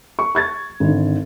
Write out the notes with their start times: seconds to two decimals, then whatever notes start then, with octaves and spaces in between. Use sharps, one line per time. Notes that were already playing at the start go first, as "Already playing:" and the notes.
0.19 C#6
0.35 C#6 G#6 A6
0.80 G#1 D3